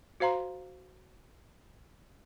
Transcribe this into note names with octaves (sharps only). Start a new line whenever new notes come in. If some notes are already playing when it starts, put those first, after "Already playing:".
F#4 C5 F5 A#5 C6